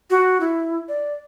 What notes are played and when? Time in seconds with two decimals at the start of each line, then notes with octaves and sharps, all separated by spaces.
0.10 F#4
0.40 E4
0.89 D5